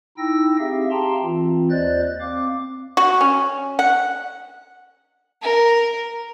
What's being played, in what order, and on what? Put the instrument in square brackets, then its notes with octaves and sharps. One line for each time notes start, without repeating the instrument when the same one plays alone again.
[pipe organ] D#4 E4 G5 E6 A#6
C4 G4 G#4 E5 F5
G4 F5 G5 A5 A#5 C6
E3 C4 F4
D#2 C5 D5 D#5 F#6 A6
C4 F5 D6
[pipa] F#4
C#4
F#5
[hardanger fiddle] A#4